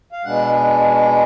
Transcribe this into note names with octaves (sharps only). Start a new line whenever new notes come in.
F5
B2 G#3 D4 F#5